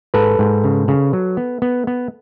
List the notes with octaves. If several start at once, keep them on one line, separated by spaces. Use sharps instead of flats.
G#2 A4 B4
G#2
C#3
C#3
F#3
B3
B3
B3